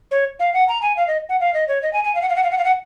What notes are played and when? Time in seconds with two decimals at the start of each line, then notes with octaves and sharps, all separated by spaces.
0.11 C#5
0.40 F5
0.54 F#5
0.68 A#5
0.82 G#5
0.97 F5
1.08 D#5
1.29 F#5
1.40 F5
1.54 D#5
1.68 C#5
1.83 D#5
1.93 G#5
2.04 G#5
2.15 F5
2.22 F#5
2.29 F5
2.36 F#5
2.44 F5
2.51 F#5
2.58 F5
2.65 F#5